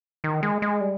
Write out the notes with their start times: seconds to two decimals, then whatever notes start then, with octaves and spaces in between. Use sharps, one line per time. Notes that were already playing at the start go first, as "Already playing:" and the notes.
0.24 D#3
0.43 G#3
0.62 G#3
0.81 G3